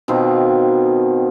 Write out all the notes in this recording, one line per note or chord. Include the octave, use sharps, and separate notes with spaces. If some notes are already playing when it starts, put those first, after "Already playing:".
B2 D#3 C4 F4